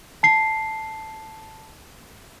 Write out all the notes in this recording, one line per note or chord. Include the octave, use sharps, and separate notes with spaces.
A5 C7